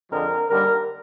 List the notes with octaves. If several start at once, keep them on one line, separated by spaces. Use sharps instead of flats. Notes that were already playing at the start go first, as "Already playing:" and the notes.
F2 D3 F3 G#3 A#4
D#2 D3 G3 A#4